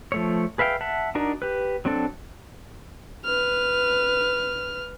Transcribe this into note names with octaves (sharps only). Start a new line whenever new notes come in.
F3 A3 C#5
G#4 B4 E5 F5 G5
E5 F#5 A5
D4 D#4 F#4 A#4 D5
G4 B4
F#3 C4 D4 A4
B4 F6